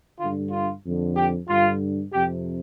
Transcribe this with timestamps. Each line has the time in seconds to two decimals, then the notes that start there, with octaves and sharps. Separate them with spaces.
0.18 G2 D3 F4
0.50 F4
0.83 F2 D3
1.16 G4
1.48 G2 D3 F4
2.13 F2 C3 G4